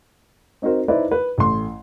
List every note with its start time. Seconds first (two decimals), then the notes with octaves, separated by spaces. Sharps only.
0.62 C4 D#4 F#4 A#4 C5
0.88 D#4 E4 B4 C5 D5 E5
1.11 B4
1.38 A1 A3 C6